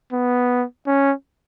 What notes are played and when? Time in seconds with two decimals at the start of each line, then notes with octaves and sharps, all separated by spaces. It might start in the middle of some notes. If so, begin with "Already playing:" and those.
0.13 B3
0.87 C#4